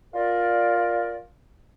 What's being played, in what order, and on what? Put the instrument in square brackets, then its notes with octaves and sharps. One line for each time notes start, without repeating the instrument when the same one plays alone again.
[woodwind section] F4 A#4 D5